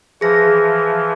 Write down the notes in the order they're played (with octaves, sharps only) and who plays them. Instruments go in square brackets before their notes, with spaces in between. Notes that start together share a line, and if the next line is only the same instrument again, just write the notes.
[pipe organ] E3 F3 [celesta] G#4 A#6